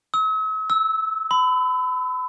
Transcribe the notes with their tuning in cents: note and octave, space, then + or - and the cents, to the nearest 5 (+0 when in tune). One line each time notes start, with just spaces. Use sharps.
E6 -45
E6 -15
B5 +35